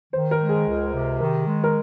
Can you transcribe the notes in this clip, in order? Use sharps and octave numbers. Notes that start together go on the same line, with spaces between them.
D#3 C5
A#4
G#3
G#4
C#2
C3
D#3 A#4
G#3
A#4